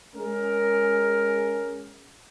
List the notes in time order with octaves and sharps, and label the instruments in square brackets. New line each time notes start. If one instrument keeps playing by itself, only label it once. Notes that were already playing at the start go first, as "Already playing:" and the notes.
[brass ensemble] G#3 C#4 G#4 A#4